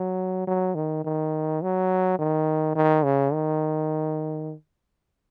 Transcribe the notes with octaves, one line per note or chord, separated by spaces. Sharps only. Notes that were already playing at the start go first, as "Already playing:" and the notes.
Already playing: F#3
F#3
D#3
D#3
F#3
D#3
D#3
C#3
D#3